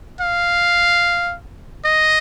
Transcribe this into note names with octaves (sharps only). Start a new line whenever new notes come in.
F5
D#5